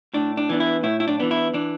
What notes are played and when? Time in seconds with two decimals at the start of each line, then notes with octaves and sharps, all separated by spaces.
0.14 A2 D4
0.37 D4
0.49 E3 B3 D4
0.60 E4
0.83 A2 E4
1.00 E4
1.08 D4
1.19 E3 B3 D4
1.31 E4
1.54 E3 D4